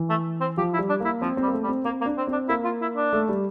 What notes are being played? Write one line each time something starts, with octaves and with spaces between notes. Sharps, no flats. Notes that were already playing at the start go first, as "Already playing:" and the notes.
Already playing: E3
A3
C4
F3 G4
E4
G3
D4
A#3 E4
F3 C4
G3 C4
A#3
A3
G3
C4
A#3 C4
A#3
D4
C4
C4 D4
A#3 E4
F4
E4
D4
A3
G3